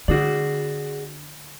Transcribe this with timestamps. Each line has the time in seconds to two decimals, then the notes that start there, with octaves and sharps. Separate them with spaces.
0.08 D3 F#4 G#4 D5